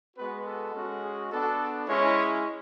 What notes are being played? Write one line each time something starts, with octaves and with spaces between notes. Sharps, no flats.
G#3 B3 F#4 B4
A4
G#3 C#4 F#4
G#4
B3 D4 F#4 A4
G#3 C#4 E4 C#5